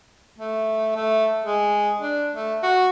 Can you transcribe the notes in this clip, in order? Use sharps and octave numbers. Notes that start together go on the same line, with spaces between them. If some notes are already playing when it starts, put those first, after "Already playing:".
A3
A3
G#3
D4
A3
F#4